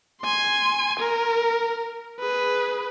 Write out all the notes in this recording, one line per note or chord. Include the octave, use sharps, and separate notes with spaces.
G#5 C6
A#4
G#4 B4